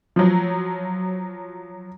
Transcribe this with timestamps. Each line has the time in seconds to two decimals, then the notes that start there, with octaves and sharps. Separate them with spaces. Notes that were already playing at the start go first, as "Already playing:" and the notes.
0.16 F3 F#3